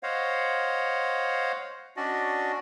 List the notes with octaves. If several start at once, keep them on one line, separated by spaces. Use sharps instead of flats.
C5 C#5 D#5 F5 F#5
C#4 D4 F#4 D5 D#5